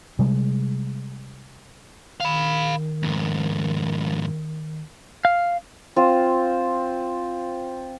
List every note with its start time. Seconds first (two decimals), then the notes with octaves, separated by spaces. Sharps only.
0.19 C3 G3 G#3
2.20 D#3 F5 B5
3.03 F2 G#2
5.25 F5
5.96 C4 F4 C5